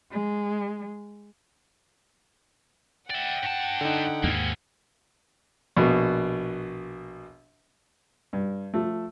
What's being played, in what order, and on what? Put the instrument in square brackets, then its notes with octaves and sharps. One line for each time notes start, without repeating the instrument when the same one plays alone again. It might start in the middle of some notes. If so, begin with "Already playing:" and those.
[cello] G#3
[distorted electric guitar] D5 E5 [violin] F#5 G5
[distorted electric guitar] G2 A5
[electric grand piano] D3 D#4
[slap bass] D#2 G#2 [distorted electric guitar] A#3 C#4
[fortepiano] A#1 B2
G2
F3 A3